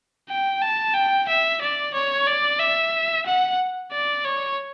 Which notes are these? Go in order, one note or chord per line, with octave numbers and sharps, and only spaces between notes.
G5
A5
G5
E5
D5
C#5
D5
E5
F#5
D5
C#5